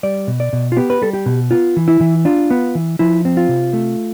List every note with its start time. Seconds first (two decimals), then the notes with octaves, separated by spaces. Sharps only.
0.03 G3 D5
0.28 B2
0.40 D5
0.53 B2
0.72 F4
0.77 B3 G4
0.90 B4
1.02 G3 A4
1.13 G4
1.26 B2
1.51 B3 F4
1.77 E3
1.88 E4
2.01 E3
2.25 D4 F4
2.51 B3
2.75 E3
2.99 F3 E4
3.25 C4
3.37 F4
3.49 C3
3.73 A3